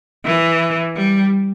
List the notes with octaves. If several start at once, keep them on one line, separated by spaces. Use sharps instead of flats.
E3
G3